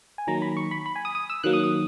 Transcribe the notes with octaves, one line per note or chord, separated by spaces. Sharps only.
G#5
D#3 F#3 A#3 A#5
B5
C#6
B5
B5
G#5
D#6
D#6
E6
D#3 F#3 A#3 F#6
D#6
D#6